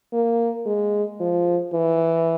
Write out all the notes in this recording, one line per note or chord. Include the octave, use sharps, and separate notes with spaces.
A#3
G#3
F3
E3